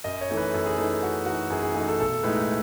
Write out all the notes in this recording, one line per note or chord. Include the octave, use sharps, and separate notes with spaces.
F#2 D#5
C#5
E3 A3 D#4
B4
F#2 A4
G#4
E3 A3 D#4 A4
F#2 F#4
E3 A3 D#4 F#4
F#2 G#4
G#4
E3 A3 D#4 G#4
A4
B1 A4
A2 G#3 D#4 B4